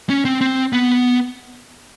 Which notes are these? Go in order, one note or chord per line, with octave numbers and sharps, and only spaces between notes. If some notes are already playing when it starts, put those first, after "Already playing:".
C#4
C4
C4
B3